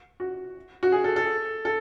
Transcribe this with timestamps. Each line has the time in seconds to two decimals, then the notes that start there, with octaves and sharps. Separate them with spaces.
0.20 F#4
0.83 F#4
0.92 G#4
1.04 A4
1.16 A4
1.65 A4